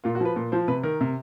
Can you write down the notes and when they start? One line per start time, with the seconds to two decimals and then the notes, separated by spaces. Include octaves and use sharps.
0.04 A#2 F4
0.15 F#4
0.20 F3 B4
0.36 A#2
0.52 F3 C5
0.68 C3 B4
0.83 D#3 A#4
1.01 C3